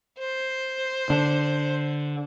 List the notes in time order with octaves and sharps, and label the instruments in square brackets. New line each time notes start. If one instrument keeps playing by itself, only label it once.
[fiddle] C5
[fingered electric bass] D3 [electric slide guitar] D4